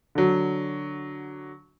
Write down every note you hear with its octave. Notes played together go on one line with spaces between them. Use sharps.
D3 F#3